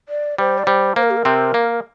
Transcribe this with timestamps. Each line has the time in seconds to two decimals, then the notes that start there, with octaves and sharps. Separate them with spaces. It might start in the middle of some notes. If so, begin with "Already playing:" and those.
0.09 D5
0.38 G3 C5
0.58 D5
0.67 G3 C5
0.96 A#3 C5
1.03 A#4
1.10 G4
1.17 A#4
1.25 C3 C4
1.54 A#3